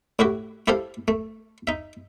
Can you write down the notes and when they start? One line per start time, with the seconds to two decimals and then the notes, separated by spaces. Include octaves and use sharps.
0.19 A2 E4 F#4 G4
0.68 E4 G4 A4 C5 F5
1.08 A3
1.67 D#4 E5